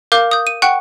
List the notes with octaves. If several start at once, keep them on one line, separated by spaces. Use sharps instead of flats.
A#4 F5 D6 G6
D#6 G6
D#7
F#5 G5 C#6 F#6